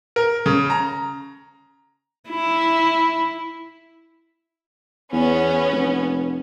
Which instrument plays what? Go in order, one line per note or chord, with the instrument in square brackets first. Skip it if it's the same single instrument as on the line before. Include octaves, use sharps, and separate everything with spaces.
[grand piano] A#4
C#3
A#5
[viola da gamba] E4
[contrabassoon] E2 [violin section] B3 C#4
[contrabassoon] F1